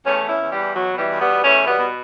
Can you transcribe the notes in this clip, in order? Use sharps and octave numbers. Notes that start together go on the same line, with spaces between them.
E2 A3 C#4
E2
C#4 E4
E2
E3 G3
E2
B2 F#3
B2
E3 G3
E2
G3 B3
B2
E2 A3 C#4
B2
G3 B3
B2